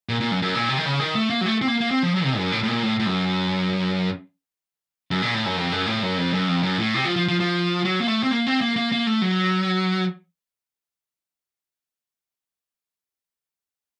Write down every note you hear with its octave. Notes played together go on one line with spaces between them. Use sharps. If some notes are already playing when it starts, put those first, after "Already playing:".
A#2
A#2
F#2
F#2
A#2
C3
D#3
C#3
D#3
A3
A#3
F#3
A3
C4
A#3
A#3
C4
F3
F#3
C3
F#2
A2
A2
A#2
A2
A2
F#2
F#2
A#2
A2
F#2
F2
F#2
A2
F#2
F2
F#2
F2
F#2
A2
C3
F3
F3
F3
F3
F#3
A#3
A3
C4
A#3
C4
A#3
A#3
A#3
A3
F#3